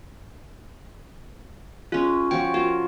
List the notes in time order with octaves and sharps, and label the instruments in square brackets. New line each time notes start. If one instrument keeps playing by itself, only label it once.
[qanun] G#3 C#4 [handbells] F4
[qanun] F3 F#4 C#5 [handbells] G5
[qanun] F4 A#4 [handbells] F#4